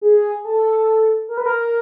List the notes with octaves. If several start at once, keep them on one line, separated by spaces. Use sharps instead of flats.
G#4
A4
A#4
B4
A#4